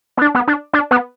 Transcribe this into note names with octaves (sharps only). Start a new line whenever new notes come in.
B3
D4
B3
D4
D4
B3